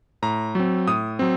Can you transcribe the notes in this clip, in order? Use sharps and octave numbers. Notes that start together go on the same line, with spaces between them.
A2 A#5
F#3 C4
A2 D#6
F#3 C4